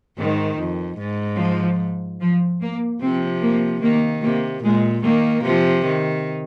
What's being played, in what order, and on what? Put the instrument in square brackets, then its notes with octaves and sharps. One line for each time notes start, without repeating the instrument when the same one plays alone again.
[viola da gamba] G#2 [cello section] D#3
[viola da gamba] F2
G#2
[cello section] F3
F3
A#3
[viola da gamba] C3 F3 [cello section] C4
[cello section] A#3
[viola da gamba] D#3 [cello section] A#3
[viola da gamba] C3 [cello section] A#3
[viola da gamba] A#2 [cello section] G#3
[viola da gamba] D#3 [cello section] A#3
[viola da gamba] C3 F3
D#3